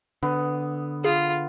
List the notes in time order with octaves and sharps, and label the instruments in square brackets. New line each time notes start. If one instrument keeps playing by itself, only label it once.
[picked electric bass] D3 [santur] B3
[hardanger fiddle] F4 [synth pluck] G#4